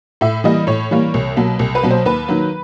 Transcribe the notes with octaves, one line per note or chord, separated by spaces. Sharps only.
A2 E5
E3 G3 A#3 D#5
A2 C#5
E3 G3 A#3
C2
B2 F#3 A#3
C2
B4
B2 F#3 A#3
C5
D#2 B4
D#3 F#3 A#3